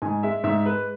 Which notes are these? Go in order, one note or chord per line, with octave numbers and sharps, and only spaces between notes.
G#2 G#5
G#3 E5
G#2 E5
G#3 B4